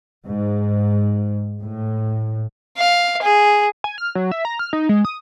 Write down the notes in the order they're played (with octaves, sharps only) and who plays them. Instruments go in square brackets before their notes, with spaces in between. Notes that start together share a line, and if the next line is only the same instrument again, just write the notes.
[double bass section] G#2
A2
[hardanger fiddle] F5
G#4
[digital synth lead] G#5
F6
F#3
E5
A#5
F6
D#4
G#3
D#6